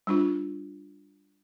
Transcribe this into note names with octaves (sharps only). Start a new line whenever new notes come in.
G3 D4 F4